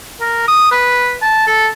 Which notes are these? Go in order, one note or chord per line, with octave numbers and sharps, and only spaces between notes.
A#4
D#6
B4
A5
A4